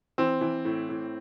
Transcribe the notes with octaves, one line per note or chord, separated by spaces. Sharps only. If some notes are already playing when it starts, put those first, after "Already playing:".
E3 C4
E3
A2
A2